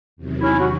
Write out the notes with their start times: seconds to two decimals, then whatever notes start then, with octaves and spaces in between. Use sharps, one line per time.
0.17 E2 C3 D#3 F#3
0.41 C#4 E4
0.58 F#4